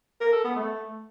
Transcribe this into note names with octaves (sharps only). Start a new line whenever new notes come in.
A#4
A4
B3
A3